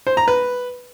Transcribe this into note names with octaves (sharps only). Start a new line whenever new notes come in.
C5
A#5
B4